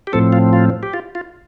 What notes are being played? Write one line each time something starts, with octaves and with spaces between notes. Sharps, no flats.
G4
A2 F3 C4 A4
F4
F4
G4
F4
F4